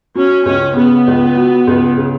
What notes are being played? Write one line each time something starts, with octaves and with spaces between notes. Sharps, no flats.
F#3 C#4
C#2 C#4
C#3 B3
C#2
F#3
C#2
C#3